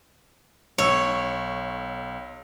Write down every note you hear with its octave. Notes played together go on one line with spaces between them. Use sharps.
B1 C#5 E6 C#7